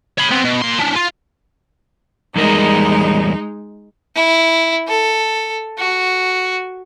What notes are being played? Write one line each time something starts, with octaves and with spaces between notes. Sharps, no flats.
C#5 B5
B3 C4
B2
A#2 C6
C#4 D4
F4
E2 G3 G#3 D#4 A#4
E4
A4
F#4